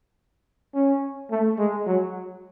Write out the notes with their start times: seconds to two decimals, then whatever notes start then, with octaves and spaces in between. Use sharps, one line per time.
0.74 C#4
1.31 A3
1.59 G#3
1.87 F#3